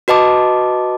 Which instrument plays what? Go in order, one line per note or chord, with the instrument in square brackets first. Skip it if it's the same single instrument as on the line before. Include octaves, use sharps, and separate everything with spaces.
[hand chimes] F#4 B4 D#5 A5 D6